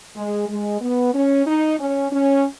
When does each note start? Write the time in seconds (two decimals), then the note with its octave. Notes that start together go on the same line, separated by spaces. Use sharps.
0.16 G#3
0.49 G#3
0.81 B3
1.14 C#4
1.47 D#4
1.79 C#4
2.11 C#4